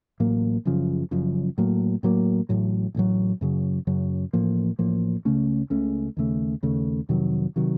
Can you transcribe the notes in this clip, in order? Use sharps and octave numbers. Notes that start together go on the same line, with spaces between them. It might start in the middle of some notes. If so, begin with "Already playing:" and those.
A1 A2 F#3 A#3
F#1 F#2 C#3 F3
F#1 F#2 C#3 F3
A2 F#3 A#3
A2 F#3 A#3
A1 A2 F#3
A1 A2 F#3
F#2 C#3 F#3
F#2 C#3 F#3
A1 A2 F3 A#3
A1 A2 F3 A#3
C#2 C#3 A3 C#4
C#2 C#3 A3 C#4
D#2 C#3 A3
D#2 C#3 A3
F2 C3 D#3 F#3
C3 D#3 F#3